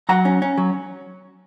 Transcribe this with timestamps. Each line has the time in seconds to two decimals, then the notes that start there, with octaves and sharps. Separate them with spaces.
0.09 F#3 F#5 A#5
0.25 C#4
0.42 C#4
0.58 F#3